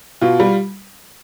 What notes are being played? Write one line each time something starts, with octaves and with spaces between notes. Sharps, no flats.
B2 F4
G3